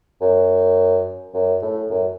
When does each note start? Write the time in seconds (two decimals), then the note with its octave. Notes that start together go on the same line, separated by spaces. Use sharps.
0.21 F#2
1.34 F#2
1.62 A2
1.90 F#2